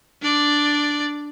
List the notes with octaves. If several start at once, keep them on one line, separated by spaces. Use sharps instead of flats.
D4 D5